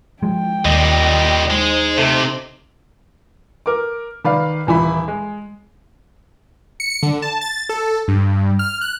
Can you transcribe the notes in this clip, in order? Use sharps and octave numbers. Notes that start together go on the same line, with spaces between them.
F3 G#3 G5
D#2 A#2 G3 D#5
G#3 D#4 C5
C3 A3
A#4 D6
D#3 B4 D5 F5
D#1 E3 E4 B5
G#3
C#7
D3
A5
A6
A4
G2
F6
F#6